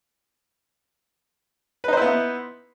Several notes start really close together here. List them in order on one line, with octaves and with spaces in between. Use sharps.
B4 D#4 C5 E4 B3